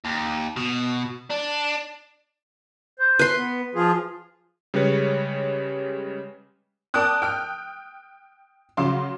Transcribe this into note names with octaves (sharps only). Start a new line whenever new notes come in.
D#2
B2
D4
C5
B4 C6
B3
F3 F4 G#4
C#3 G3 G#3 C#4 B4 C#5
A#4 D5 G5 A5 D#6 F#6
G5 F6
C#3 F#3 F5 C6 D6